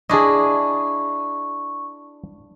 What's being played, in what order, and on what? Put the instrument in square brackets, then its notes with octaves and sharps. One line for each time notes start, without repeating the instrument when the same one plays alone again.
[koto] D4 E4 [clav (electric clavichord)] G#4 D#5 [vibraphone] C#6